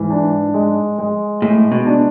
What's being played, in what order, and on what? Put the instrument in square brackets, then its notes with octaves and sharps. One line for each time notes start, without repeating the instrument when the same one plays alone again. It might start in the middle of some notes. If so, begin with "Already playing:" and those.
Already playing: [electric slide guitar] G#2 [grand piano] E3
[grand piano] D4
G#3
G#3
[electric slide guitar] A2 [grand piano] G#3
[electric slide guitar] B2
[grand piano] D4